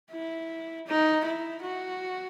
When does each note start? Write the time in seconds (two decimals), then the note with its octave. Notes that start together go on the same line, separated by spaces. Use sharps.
0.12 E4
0.87 D#4
1.25 E4
1.63 F#4